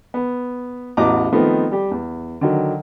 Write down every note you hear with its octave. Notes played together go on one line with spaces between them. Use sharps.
B3
A1 E2 F#4 D#5 A#5 D6
D#3 F3 A3 B3 C4 D#4
G3 G4
E2
D3 D#3 F#3